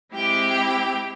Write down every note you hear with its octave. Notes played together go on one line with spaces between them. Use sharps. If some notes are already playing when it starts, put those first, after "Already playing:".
G#3 C4 E4 G4 G5